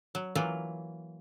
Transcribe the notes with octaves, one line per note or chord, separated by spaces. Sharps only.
F#3
E3 F#3 A#3 F4